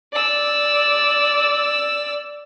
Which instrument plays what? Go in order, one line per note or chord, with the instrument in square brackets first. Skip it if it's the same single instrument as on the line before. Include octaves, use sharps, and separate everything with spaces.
[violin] D5 E6